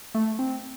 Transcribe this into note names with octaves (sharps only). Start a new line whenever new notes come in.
A3
C4